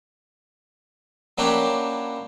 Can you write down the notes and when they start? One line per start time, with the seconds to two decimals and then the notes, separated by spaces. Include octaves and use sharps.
1.38 F#3 A#3 C#4 D4 E4 G4